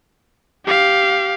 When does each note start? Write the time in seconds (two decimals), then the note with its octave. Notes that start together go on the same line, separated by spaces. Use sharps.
0.66 G4 F5